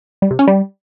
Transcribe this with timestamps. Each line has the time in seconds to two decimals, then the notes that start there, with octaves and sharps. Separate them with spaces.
0.22 G3
0.31 C3
0.39 C#4
0.47 G3